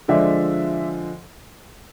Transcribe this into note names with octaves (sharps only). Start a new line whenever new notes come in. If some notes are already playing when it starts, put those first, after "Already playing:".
D3 F3 G#3 D5 E5